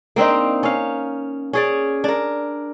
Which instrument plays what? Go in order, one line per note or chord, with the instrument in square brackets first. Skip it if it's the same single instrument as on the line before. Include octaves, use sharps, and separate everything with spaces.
[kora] A#3 C4 D4 D#4
C#4 F5
C#4 G#4 D5
D4 A#4